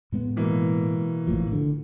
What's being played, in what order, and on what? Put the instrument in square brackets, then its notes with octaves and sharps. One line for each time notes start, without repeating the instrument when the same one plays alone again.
[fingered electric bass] A2 G#3 B3
[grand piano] B2 E3 A#3
[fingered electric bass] G#1 A2 F3
D3